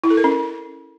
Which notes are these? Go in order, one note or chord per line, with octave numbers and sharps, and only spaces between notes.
E4
A4
A#4
C#4